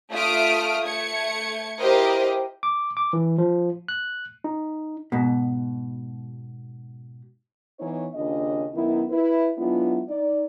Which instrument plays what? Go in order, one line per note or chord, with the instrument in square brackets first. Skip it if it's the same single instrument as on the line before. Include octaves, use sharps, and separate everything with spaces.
[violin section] A3 F4 E5 D#6 F6 D7
A3 G#6 C#7
E4 G4 A#4 C5 D#5
[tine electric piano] D6
D6
E3
F3
F#6
D#4
[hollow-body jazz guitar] G#2 B2
[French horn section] E3 B3 D#4 C#5
D#2 C#3 D4 F4 D#5
F#2 D#3 B3 D#4 E4
E4 B4
F#3 G#3 B3 D4 E4 F4
D#4 D5